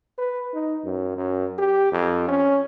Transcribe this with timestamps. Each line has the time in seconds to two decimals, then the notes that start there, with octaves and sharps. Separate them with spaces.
0.19 B4
0.54 D#4
0.84 F#2
1.17 F#2
1.59 G4
1.92 F2
2.29 C#4